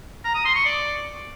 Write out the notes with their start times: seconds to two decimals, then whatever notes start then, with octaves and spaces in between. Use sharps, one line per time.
0.24 A#5
0.35 D#6
0.45 C6
0.55 C#6
0.65 D5